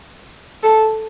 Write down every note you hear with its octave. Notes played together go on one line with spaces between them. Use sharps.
A4